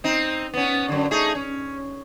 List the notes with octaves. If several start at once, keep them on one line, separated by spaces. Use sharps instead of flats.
C4 D#4
B3 C#4
F#2 D3
A3 D#4 G#4
C#4